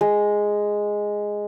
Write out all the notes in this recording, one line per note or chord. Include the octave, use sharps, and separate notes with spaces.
G#3